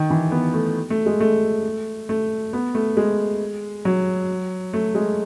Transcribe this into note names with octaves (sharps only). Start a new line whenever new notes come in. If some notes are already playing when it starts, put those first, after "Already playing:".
Already playing: D#3
E3
B3
A3
A3
G#3
A3
A3
B3
A3
G#3
F#3
A3
G#3